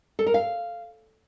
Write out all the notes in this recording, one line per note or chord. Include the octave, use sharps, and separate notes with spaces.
A4
A#4
F5